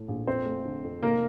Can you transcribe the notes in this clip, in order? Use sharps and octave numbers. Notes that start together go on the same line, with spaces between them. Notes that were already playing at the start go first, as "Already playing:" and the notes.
Already playing: A2 A3
A#1
F2 C4 C5
A3
D3
F2
F1 A#3 A#4